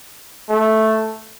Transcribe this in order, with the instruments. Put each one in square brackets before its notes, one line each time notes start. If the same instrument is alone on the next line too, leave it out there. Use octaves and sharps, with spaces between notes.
[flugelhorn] A3